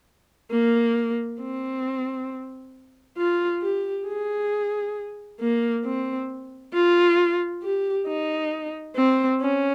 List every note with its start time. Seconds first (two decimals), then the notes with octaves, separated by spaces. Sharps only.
0.51 A#3
1.40 C4
3.18 F4
3.62 G4
4.06 G#4
5.40 A#3
5.84 C4
6.73 F4
7.63 G4
8.07 D#4
8.96 C4
9.40 C#4